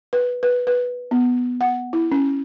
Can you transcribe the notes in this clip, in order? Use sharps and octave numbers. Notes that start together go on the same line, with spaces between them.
B4
B4
B4
B3
F#5
E4
C#4